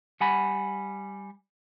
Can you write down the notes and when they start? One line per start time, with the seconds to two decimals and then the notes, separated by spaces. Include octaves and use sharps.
0.21 G3 F#5 G#5 B5